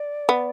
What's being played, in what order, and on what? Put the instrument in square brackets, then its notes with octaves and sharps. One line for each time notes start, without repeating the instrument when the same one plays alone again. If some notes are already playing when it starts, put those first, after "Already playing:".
Already playing: [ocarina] D5
[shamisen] B3